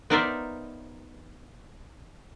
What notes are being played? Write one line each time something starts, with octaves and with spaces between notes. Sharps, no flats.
B3 D#4 A#4 C5 D5 E5